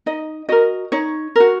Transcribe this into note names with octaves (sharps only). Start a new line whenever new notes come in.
D#4 D#5
F#4 A#4 D#5
D#4 C#5
F#4 A#4